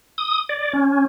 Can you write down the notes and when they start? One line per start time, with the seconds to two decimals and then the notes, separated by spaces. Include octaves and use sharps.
0.18 D#6
0.49 D5
0.73 C#4